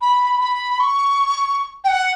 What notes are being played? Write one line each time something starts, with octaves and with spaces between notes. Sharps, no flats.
B5
B5
C#6
G5
F#5